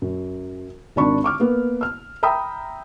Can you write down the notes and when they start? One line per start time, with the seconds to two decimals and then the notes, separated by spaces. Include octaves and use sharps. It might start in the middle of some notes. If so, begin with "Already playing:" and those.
0.02 F#2
0.96 G#1 D#3 D4 D5 B5 C#6
1.24 C#6 D6 F6
1.40 A#3 B3
1.81 E6 F6
2.23 E5 G5 A#5 B5 D#6 E6